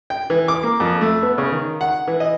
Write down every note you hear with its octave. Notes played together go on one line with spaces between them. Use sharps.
G5
E3
D6
A#3
F2
A3
B3
C#3
D#3
F#5
E3
D#5